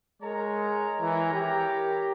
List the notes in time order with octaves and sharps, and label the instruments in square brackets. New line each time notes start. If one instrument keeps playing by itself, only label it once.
[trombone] G#3 [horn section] A#4 C#5 A#5
[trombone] E3
G4